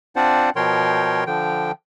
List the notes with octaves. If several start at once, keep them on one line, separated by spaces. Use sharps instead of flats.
C4 D4 F4 C5 D5 F#5
B2 F3 A#4 C#5 G5 C6
D3 F3 G5